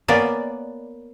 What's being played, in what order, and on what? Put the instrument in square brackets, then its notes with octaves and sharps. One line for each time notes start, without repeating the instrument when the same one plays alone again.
[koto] A#3 B3 C#4 B4 D5